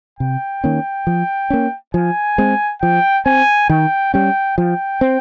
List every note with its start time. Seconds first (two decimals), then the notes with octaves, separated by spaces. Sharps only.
0.19 C3 G5
0.64 D#3 A#3 C#4
1.07 F3
1.50 A#3 C#4
1.94 F3 G#5
2.38 G#3 C4
2.82 F3 G5
3.26 C4 G#5
3.69 D#3 G5
4.14 G3 C#4 G5
4.58 F3 G5
5.01 C4